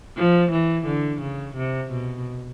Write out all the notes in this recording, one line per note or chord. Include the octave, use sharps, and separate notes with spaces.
F3
E3
D3
C#3
C3
B2